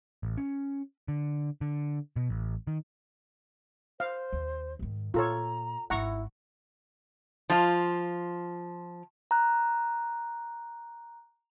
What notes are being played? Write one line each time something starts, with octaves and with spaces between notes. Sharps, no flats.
A1
C#4
D3
D3
B2
A1
D#3
C5 F5
D#2
G#2 D#3
A#2 F4 A4 C#5 A#5
G#1 D#4 E4 F#5 A#5 C#6
F3 F4
A#5 F#6